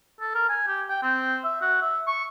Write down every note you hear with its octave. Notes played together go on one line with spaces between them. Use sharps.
A4
A#4
G#5
G4
G5
C4
E5
F#4
E5
C#6